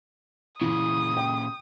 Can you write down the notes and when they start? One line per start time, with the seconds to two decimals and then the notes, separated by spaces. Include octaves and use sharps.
0.61 A#2 C#3 E3 D#6
1.17 G5